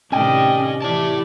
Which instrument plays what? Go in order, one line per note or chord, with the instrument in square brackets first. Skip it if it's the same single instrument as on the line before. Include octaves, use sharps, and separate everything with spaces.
[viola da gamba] A2 C3 D#3 [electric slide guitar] C#4 [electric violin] D5 D#5 [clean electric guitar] G5
[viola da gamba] E3 G4 [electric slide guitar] E4 A5 [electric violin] D5